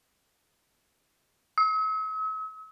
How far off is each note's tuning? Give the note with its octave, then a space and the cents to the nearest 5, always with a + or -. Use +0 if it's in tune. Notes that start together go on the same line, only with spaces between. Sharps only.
E6 -45